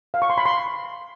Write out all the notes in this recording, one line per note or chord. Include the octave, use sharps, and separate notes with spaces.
F5
C#6
C6
B5
C6